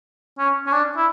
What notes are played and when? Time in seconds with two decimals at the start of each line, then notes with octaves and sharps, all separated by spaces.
0.38 C#4
0.66 C#4
0.72 D4
0.97 E4